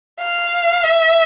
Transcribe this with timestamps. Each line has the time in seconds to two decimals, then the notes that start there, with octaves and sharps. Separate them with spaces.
0.20 F5
0.84 E5